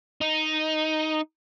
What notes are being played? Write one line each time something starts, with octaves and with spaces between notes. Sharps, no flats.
D#4